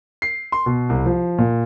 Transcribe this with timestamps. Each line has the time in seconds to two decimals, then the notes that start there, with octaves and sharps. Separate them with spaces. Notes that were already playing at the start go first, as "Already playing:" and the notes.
0.22 C7
0.52 C6
0.66 B2
0.89 C2
1.06 F3
1.38 A#2